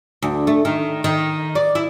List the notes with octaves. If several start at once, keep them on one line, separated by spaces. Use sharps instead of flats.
D2
A3
D#3
D#3
D5
E4